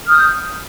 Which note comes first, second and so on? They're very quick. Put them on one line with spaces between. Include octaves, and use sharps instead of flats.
F6 D#6 G6